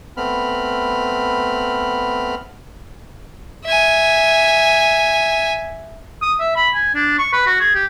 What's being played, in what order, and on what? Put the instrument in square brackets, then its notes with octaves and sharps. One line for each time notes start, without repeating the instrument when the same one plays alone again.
[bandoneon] A3 B3 C4 B5 F6
[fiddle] E5 G#5
[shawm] D#6
E5
B5
G#5
D4
C#6
B4
F#4
G#4
G4